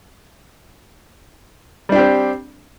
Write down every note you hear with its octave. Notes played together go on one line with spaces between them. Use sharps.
G3 C4 D4 G4